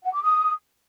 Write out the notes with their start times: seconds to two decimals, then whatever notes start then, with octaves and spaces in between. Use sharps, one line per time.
0.04 F#5
0.13 D6
0.22 D#6